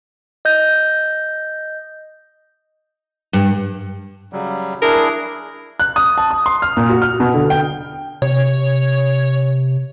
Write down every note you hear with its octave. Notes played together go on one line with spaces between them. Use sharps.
D#5 G6 A#6
G2
C#3 F#3 G3
D4 E4 G#4 A#4
F#6
D#6
A5
D#6
C6
F6
A#2
F#4
F6
B2
D3
G5
C3 C#5